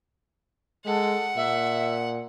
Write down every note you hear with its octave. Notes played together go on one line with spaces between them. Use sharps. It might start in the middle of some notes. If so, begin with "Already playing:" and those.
G#3 A4 F#5
A#2 E5